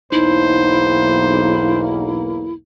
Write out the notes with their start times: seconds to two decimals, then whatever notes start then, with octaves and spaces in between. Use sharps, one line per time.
0.12 B1 E2 A#3 D#4 E4 C5